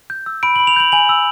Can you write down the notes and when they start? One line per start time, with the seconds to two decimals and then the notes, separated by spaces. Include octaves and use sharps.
0.10 G6
0.26 E6
0.43 B5 D7
0.56 F#7
0.60 B5
0.67 F7
0.76 G6 F#7
0.92 G#5 F#7
1.09 E6